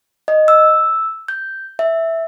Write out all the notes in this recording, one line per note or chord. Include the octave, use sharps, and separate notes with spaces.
D#5
E6
G6
E5